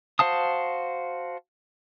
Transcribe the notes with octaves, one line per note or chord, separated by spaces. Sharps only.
F#4 C5 F5 A5 D#6